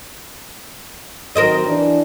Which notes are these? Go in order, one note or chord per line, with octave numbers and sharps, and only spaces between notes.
D#3 F#3 C4 A#4 C5 D#5
E3 D4